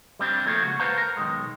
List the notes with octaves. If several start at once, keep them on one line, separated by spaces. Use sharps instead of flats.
G3 C4 D4
F3 A3 A#3 G#4 A4
C#2 F#4
B4 C5 F5 F#5 A5 A#5
A#4
B1 D#3 G#3